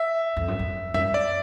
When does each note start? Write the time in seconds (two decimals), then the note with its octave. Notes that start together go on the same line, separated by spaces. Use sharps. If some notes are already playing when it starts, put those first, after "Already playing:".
Already playing: E5
0.36 F2
0.48 F#2
0.59 F2
0.94 F#2 E5
1.14 D5